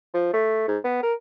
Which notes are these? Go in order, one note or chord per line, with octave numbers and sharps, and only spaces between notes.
F3
A3
G#2
B3
A#4